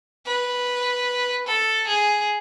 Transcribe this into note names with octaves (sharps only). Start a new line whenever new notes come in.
B4
A4
G#4